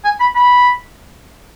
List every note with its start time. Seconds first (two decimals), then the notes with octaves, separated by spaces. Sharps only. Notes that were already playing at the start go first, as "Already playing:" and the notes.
0.04 G#5
0.20 B5
0.36 B5